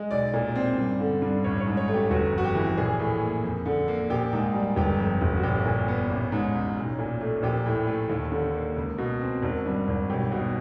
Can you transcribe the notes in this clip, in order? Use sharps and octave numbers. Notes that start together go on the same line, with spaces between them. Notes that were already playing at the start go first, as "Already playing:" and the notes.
Already playing: G#3
B1 D5
A#2
C4
G2
D3
G2
A1 C#5
C#5
G#2
C#5
A3
G4
G1 F#4
F2
F#4
G4
E3
A#1 G#4
A2
A#3
F2
D3
A#3
A#1 G4
G#2
G3
G1 G4
F2
G1
F#4
A#1 G4
A#2
B3
A1
G#2
A1
B1
A#2
A3
A#1 G4
A2
A3
D#2
D3
A#3
C#2
B2
C4
G#1
G2
G#1
B1 G4
B2